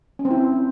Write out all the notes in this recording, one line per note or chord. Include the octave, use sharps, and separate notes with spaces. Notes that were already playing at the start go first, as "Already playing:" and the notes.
C#4
C4
E4